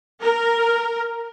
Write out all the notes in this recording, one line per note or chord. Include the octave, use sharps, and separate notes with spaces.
A#4